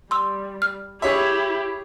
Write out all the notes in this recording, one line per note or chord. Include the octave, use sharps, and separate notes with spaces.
G3 C6 E6
F6
E4 G4 G#4 C#5 E5